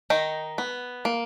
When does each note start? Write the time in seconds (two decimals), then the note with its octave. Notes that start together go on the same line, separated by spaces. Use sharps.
0.10 D#3 D#4
0.58 B3
1.05 A#3